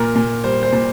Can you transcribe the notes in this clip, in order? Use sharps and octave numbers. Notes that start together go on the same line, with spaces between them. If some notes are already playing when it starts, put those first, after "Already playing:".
Already playing: A#2 A#4
A#2
G3 C5
C5
A#2